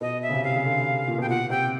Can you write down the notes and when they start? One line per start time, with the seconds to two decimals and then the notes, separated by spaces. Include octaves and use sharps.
0.01 B2 D#5
0.22 E5
0.29 C#3
0.33 C3
0.44 C3 F5
0.55 C#3
0.65 D3
1.07 A#2
1.18 B2 G5
1.29 A#2 F#5
1.50 C3 G5